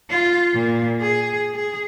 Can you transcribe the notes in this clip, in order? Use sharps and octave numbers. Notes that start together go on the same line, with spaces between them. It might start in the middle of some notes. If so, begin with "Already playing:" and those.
F4
A#2
G#4
G#4